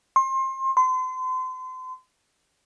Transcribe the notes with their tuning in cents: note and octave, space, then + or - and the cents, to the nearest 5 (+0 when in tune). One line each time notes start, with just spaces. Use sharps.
C6 +30
C6 -35